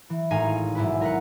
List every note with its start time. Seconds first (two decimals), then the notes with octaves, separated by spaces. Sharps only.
0.10 E3
0.30 G#1 A2 D#4 F5 G#5
0.75 B1 G#2 E4 B4
1.01 A#4 B4 F#5